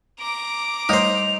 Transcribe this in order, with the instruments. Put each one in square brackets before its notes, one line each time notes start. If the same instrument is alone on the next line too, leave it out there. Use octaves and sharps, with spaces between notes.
[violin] A#5 D6 [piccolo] D7
[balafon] G3 A3 C#5 [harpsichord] D#4 C5 [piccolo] F7